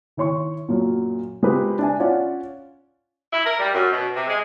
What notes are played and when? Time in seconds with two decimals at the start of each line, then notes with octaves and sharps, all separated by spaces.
0.17 D#3 E4 C#5 C6 C#6
0.69 F#2 A#2
1.43 G#3 C4 F4 G4 A#4 B4
1.79 D4 E5 G#5
2.00 C#4 F4 D5 F#5
3.31 E4
3.45 A#4
3.59 G3
3.73 F#2
3.90 B2
4.14 C3
4.27 G#3